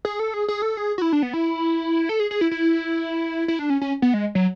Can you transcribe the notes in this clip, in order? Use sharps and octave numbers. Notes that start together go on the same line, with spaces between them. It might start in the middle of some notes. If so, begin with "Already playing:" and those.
G#4
A4
G#4
G#4
A4
G#4
F#4
E4
D4
B3
E4
A4
G#4
G#4
E4
E4
E4
D4
C#4
C#4
B3
G#3
F#3